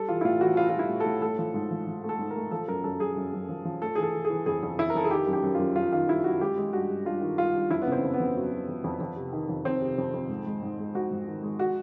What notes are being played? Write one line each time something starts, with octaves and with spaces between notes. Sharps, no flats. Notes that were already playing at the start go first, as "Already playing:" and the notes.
Already playing: G3 A4
E3 F4
E4
A2 F4
E3 F#4
E3 F4
F4
G3
E4
A2
A4
A2
A3 A4
F3
G#2
F3
F3
A3
A4
G#2
A#4
A3
F3 A4
F#2 A#4
F#2 A4
F#2 G#4
F#2
F#2
F3
F3
A3 A4
E3 G#4
A4
E3
G#4
E3
F2 G#4
F2
F2 E4
A#4
F2 A4
G#4
D#3 G4
F#2
G4
F#2
F#2 F4
F#2 F4
D#3 F4
G3 E4
F#2 F#4
G#3 G4
G#3
G2 F#4
G2
G2 F4
D#3
G2 F4
G2
F2 E4
B3
C#3
C4
F2
B3
F2
F#3
F#3
F2
F2
F2
C3
D#3
F2
F2 C4
C3
F2
F2
G#2
G#3
G#2
G#3
G#2 F#4
G#2
D#3
G#3
F#4